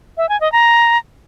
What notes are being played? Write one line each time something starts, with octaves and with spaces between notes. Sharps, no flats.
E5
G#5
D#5
A#5